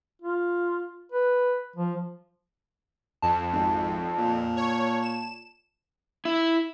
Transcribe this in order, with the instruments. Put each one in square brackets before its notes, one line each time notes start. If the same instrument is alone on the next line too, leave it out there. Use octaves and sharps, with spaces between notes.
[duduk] F4
B4
F3
[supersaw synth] F2 [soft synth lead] A5
[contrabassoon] G#1
A#2
[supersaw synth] C#5
E7
[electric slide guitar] E4